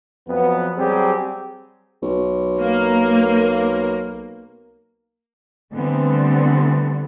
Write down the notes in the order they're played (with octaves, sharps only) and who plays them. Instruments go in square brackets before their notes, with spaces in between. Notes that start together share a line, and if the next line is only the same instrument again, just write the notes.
[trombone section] F2 F#3 B3
F#3 G3 C4 G4 G#4
[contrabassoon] B1
[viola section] A#3
[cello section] D3 E3 G3 A3 B3 C4